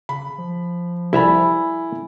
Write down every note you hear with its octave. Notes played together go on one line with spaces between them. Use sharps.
C#3 B5
F3
C2 E4 A4 E5 G#5 A#5 B5